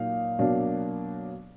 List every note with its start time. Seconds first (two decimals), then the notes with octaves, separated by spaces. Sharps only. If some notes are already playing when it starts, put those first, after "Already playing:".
Already playing: A#2 F#3 A#3 D#4 F5
0.39 B2 F#3 A#3 D4